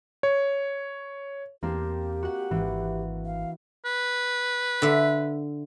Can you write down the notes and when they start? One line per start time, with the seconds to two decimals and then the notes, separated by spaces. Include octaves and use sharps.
0.23 C#5
1.63 E2 A#3 C4 D4 G4
2.23 F#4 F#5
2.51 G#1 E3
3.26 F5
3.85 B4
4.82 D3 E5